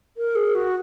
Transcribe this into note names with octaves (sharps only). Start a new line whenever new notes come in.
A#4
G#4
F#4